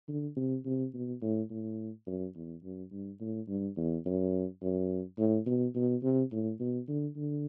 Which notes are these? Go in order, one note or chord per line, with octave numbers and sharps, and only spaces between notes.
D3
C3
C3
B2
A2
A2
F#2
E2
F#2
G2
A2
G2
E2
F#2
F#2
A2
B2
B2
C3
A2
B2
D3
D3